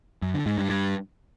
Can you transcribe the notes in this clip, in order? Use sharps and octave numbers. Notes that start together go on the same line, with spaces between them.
F#2
D3
G#2
G2
G2